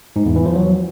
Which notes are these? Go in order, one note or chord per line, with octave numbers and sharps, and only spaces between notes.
G#2
E2
E3
F3
F#3